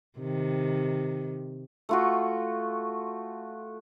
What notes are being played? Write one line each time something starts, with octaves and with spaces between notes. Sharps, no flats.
C3 D#3
A3 F4 F#4